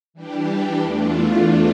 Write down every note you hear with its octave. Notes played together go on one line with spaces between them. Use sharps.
E3 G3 D4 G4
E2 E3 A3 D4 F4